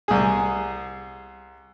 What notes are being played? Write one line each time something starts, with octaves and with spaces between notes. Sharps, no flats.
C2 G#4